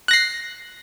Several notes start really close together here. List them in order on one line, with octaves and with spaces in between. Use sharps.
F#6 A#6 C7